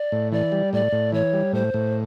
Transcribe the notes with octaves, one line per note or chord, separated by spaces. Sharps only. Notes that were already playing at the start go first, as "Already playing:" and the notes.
Already playing: D5
A2
E3 D5
G3
A2 D5
A2
E3 C#5
G3
A2 C5
A2